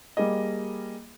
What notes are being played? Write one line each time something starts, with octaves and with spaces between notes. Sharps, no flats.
G3 A#3 G#4 D#5